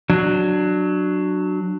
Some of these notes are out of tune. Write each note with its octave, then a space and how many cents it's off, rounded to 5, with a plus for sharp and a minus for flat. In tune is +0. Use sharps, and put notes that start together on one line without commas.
F#3 +0 D4 +20